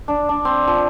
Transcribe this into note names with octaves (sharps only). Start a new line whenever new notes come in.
D4
D4
C4
F3